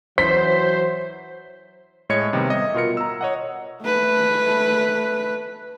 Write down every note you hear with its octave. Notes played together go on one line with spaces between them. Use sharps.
E3 F#3 C5 B6
A2 G#3 C#5 D#5 G#6 C#7
C3 D#3 G3 A3 B3
D#5 E5
B2 F4 A#4 C#7
A#5 E6
C#5 D#5 F#5
A3 B4